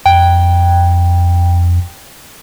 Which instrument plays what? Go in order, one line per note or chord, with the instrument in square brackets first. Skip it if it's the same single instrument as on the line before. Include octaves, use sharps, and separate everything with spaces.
[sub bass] F2 [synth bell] G5